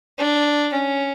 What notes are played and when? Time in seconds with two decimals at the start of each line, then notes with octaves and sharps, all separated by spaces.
0.18 D4
0.73 C#4